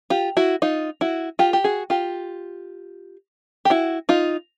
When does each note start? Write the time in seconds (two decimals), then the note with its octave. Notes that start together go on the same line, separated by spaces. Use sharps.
0.10 F4 G4
0.37 E4 F#4
0.62 D#4 F4
1.01 E4 F#4
1.39 F4 G4
1.53 G4
1.64 F#4 G#4
1.90 F4 G4
3.65 G4
3.70 E4 F#4
4.09 D#4 F4